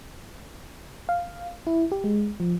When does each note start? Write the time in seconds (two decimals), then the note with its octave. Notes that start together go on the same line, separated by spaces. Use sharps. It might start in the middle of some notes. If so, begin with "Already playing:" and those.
1.09 F5
1.67 E4
1.92 G4
2.04 G#3
2.40 F3